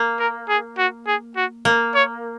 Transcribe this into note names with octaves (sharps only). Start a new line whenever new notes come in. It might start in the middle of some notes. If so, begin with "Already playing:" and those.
Already playing: A#3
A#4
G#4
F#4
G#4
F#4
A#3
C#5